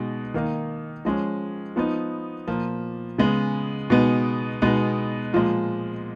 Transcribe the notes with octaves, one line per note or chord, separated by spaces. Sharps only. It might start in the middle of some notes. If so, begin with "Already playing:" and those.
Already playing: B2 G#3 D#4
D#3 A#3 D#4
F3 G#3 C#4
F3 B3 D#4
A#2 F3 A#3
C#3 G#3 B3
B2 G#3 B3 D#4
B2 G#3 B3 D#4
A#2 F3 G#3